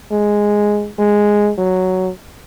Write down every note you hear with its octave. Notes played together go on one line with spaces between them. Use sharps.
G#3
G#3
F#3